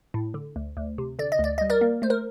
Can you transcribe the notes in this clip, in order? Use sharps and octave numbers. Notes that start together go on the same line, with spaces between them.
A2
D3
D2
D2
C3
D3 D5
D#5
D2 D5
G3 D#5
A#4 D5
A#3
A3 C5
A#4